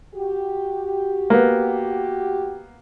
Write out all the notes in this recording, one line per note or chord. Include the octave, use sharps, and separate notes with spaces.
F#4 G4
A#3 B3